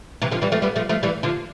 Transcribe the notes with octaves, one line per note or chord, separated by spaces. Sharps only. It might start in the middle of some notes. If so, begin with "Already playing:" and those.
C3 E3
D3 F3
E3 G3
F3 A3
G3 B3
F3 A3
F3 A3
E3 G3
D3 F3